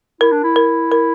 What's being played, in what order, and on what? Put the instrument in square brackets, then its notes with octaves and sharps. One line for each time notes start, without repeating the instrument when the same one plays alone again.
[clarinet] E4 [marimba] A#4
[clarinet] D4
E4
[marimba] A#4
A#4